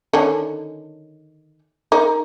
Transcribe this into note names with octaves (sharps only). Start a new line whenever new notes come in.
D3 D#3 C#4
D#4 A#4